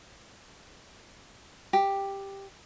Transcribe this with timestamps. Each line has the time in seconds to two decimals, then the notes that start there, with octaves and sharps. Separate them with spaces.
1.73 G4